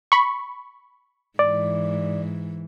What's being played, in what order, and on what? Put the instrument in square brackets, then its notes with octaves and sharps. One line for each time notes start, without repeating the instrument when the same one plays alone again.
[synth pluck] B5 C#6
[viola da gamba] G#2 E3 [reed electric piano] D5